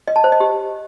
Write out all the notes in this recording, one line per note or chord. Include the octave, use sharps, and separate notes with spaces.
D#5
A5
C5
D#5
G4